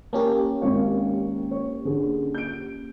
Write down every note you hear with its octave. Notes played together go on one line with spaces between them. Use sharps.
A#3 C#4 G4 A5
G#1 C#5 F5
C#5
D3 G#4
G6 D7